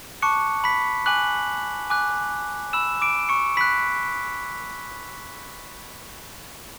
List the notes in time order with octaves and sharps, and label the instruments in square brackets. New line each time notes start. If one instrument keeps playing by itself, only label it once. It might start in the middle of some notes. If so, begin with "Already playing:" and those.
[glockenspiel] A5 C#6 D6 F#6 C#7
B5 B6
G#5 D6 F#6 F#7
G#5 D6 F#6
B5 E6 E7
D6 D7
C#6 C#7
B5 B6
F#6